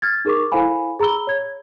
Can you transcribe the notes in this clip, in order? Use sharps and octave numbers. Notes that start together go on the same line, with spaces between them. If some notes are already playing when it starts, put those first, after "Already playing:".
F6 G#6 A6
D#4 G#4 A#4 C#6 D6
E4 A4 C5 F5 G#5 B5
G#4 A#5 B5 E6 G7
C#5 G#6